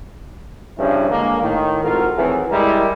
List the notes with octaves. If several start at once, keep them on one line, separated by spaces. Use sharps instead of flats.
G2 C#3 F3 G3 C#4 E4
D3 G#3 A#3
A2 D#3
G#1 G#2 F4 F#4 A4 A#4
D#3 E3 F#3 A3 C4 G#4
G3 G#3 E4 A#4